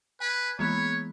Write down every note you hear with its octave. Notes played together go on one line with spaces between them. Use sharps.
B4 G#5 G6 G#6
E3 G#3 A#3 B3 C#5 B6